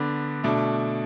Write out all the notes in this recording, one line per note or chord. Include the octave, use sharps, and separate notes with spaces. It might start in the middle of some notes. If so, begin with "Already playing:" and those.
Already playing: D3 B3 D4
B2 A3 D4